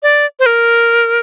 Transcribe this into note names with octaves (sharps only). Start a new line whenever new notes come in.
D5
C5
A#4